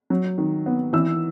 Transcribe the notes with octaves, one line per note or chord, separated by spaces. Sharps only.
F#3
D#3
B3
E3 E6